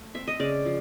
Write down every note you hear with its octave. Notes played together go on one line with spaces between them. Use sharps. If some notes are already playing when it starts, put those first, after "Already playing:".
Already playing: A3
C4 E5
D#5
C#3 D5
F3